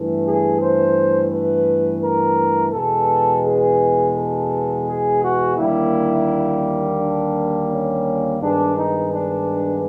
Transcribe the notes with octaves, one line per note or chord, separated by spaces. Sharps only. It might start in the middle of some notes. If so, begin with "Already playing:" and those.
Already playing: G2 E3 A3
G#4
C5
B4
A#4
E2 B2 G#3 B3 A4
G#4
A4
G#4
F#4
D#2 D3 G3 A#3 E4
D4
C#4
G2 D#3 G#3 B3 D4
D#4
D4